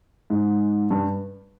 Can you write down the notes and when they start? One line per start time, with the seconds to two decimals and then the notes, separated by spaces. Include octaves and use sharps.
0.30 G#2
0.91 G2